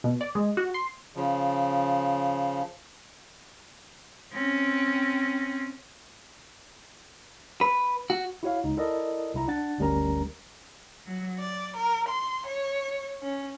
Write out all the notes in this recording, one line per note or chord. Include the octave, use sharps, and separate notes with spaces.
B2
D5
G#3
F#4
C6
C#3 F3
C4 C#4
B4
F#4
E4 F#4 C#5 F5
C#2 D#4
E4 A4 A#4 D5 D#5
C2 E4 A#5
D4 F#5 A6
G1 D2 G3 C#4 A#4 A#5
F#3
D5
A#4
C6
C#5
C#4